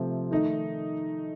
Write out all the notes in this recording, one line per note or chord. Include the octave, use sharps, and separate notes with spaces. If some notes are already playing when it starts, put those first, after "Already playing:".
Already playing: C3 F3 A3 C4
D#3 A3 D#4